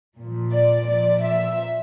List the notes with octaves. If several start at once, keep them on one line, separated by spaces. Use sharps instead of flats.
A#2 F3
D5
A#2 F3 D5
E5